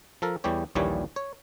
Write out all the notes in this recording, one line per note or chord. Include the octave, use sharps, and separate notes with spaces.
F3 A4 A#4
E2 E3 G3 G4 C#5
A#1 D#2 A#2 E3 G3 C#5
C#5